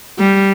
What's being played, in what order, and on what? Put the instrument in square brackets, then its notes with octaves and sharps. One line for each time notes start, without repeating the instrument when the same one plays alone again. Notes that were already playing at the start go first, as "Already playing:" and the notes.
[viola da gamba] G3